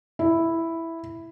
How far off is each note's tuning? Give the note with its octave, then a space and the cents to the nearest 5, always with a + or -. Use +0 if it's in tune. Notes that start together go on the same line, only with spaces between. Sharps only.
E4 +0